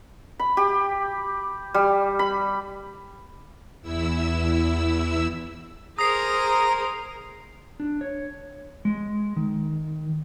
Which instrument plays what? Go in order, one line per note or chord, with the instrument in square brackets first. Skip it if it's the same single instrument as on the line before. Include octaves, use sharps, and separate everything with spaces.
[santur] B5
G4
G3
B5
[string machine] E2 E4 E6
[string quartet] G#4 A#4 C5 [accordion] A#5 [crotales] D#6 C7
[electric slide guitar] D4
C#5
G#3
D#3